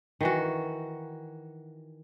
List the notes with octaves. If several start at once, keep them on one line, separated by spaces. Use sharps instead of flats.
D#3 E3 F#4